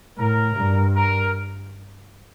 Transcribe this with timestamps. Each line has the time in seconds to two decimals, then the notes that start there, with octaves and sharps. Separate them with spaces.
0.18 A2 A#4
0.56 G2
0.96 A#4